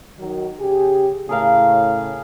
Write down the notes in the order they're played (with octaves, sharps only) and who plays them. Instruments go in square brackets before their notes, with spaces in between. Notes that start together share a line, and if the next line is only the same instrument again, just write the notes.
[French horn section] D#3 F#3
C#3 G4 G#4
[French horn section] A2 C#3 [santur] G#4 A#4 F5